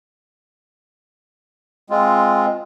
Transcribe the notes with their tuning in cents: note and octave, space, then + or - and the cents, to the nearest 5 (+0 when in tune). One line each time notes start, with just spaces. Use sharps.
G#3 +0 C4 +0 F4 +0